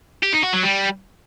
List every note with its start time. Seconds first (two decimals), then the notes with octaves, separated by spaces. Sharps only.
0.23 G4
0.33 D#4
0.43 F#4
0.53 F#3
0.63 G3